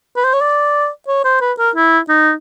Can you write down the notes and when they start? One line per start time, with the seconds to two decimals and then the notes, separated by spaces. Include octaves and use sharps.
0.16 B4
0.24 C5
0.33 C#5
0.41 D5
1.08 C#5
1.24 C5
1.41 B4
1.58 A#4
1.75 E4
2.09 D#4